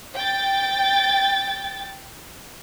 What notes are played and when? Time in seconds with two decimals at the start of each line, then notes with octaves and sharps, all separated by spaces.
0.17 G5 A6